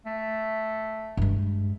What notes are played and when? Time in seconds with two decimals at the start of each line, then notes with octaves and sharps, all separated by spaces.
0.06 A3
1.17 G2 G#3